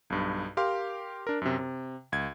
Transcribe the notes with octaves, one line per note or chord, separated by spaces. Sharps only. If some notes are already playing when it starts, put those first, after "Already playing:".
B1 G2
G4 A#4 F5 C6
D4 A#4
F#2 C3
C3
C#2 G#6